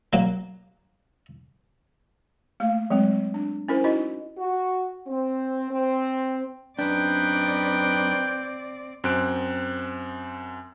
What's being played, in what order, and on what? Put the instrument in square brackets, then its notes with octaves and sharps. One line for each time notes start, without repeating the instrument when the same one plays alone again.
[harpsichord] F#3 A#3
[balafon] A3 A#3 F5
F#3 G#3 C4
D4
C#4 E4 A#4 C5
D#4 E4 F#4 D#5
[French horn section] F#4
C4
C4
[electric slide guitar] F#2 D4 [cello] C4 D5 [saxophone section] D#4 B4 [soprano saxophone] G5
[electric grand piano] F#2 C4 F#6 D7